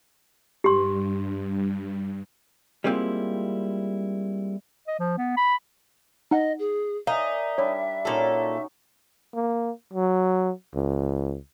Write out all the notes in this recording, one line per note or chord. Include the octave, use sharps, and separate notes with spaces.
G2 G4 C6
G3 G#3 A#3 C4 E4 F4
D#5
F3
B3
B5
D#4 D#5 F#5
G#4
D#4 A#4 D5 E5 F5 G#5
G3 D4 E4 C#5
A#2 C#4 D#4 F#4 A4
A#3
F#3
C#2